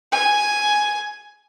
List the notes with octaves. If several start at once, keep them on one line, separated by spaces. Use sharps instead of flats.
G#5